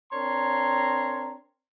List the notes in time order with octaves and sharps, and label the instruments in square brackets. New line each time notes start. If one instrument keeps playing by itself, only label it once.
[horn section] C4 D4 A#4 C#5 A#5 C6